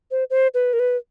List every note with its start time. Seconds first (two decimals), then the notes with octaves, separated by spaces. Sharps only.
0.11 C5
0.30 C5
0.54 B4
0.73 A#4
0.79 B4